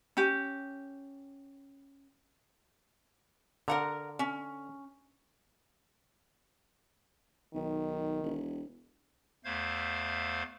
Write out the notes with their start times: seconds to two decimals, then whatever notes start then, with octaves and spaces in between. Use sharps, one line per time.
0.17 C#4 G4
3.68 D3 A#4 F#5 A#5
4.19 C#4
7.54 B1 D#3
8.23 E1
9.45 E2 A3 C5 F5 G#6